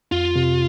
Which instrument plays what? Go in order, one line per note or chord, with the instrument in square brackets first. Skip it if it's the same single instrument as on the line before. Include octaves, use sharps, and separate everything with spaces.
[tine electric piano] F2 [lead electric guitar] F4
[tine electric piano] C3